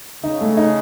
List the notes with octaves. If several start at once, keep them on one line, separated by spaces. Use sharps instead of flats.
C#3 D#4
A3
D#4